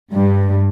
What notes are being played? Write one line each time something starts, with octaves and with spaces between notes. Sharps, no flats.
G2